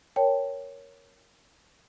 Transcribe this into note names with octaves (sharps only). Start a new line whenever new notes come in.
A#4 C#5 G5 A5